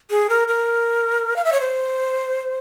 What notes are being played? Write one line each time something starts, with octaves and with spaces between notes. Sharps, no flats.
G#4
A#4
A#4
F5
E5
C#5
C5